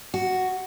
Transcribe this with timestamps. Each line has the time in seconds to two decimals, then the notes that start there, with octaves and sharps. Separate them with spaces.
0.14 F#4